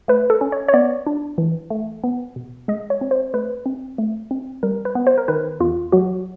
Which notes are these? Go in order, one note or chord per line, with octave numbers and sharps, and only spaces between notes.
A3 B4
A4
C#4
C#5
C#5
B3 D5
D4
E3
A3
B3
B2
G#3 D#5
C#5
C4
C5
A3 B4
C4
A3
C4
G3 A#4
B4
B3
C5
A#4
D#3 B4
E2 F4
F#3 F#4